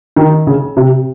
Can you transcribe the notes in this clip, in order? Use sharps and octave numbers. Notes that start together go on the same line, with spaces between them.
D#3
C#3
C3